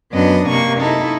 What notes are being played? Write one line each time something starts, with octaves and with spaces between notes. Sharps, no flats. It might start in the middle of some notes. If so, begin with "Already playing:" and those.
F#2 B3 D4 D#5
C3 A#3 C#6
D#4 E4 A4